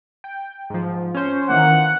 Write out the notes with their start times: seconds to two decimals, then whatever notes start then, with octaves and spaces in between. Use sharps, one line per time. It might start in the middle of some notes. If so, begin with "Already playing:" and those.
0.24 G5
0.70 G#2 F3
1.14 C#4 C5
1.49 D#3 E3 A#3 F#5